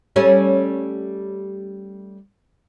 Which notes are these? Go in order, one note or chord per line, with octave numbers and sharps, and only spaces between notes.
G3 A3 C#4